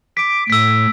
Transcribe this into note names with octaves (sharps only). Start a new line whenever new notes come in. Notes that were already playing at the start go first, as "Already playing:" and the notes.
D6 B6 D7
A2 E6 B6